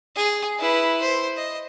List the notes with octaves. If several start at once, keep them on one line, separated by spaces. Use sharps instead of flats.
G#4
E4 B4
C5
D#5